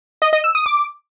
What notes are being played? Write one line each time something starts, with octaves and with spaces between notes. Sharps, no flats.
D#5
D#5
E6
D#6
D6